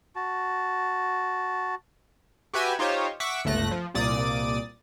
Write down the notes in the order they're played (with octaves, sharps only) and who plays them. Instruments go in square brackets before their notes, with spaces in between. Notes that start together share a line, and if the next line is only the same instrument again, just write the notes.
[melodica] F#4 A5
[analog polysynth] F#4 G4 B4 E5 G5 G#5
D#4 F4 G4 C5 C#5
E5 F#5 C#6 D6 B6
G1 C#2 A3 F#6 A#6
F3
C2 A#2 D5 D#6 A6